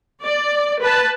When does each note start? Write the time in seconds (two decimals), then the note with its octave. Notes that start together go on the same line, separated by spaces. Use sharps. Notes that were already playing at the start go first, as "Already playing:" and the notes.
0.22 D5
0.82 B4 A5